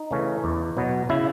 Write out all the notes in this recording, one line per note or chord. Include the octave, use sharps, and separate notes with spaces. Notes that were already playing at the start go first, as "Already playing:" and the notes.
Already playing: D#4
C#3 E3 A3 C#4
E2
B2 F#3 B3
C#3 E4